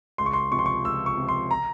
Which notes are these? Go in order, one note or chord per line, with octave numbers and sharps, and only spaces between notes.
C#2 C6
C#6
C6
C3 F3 C#6
C6
C#6
C#2 E6
C#6
C3 F3
C6
A#5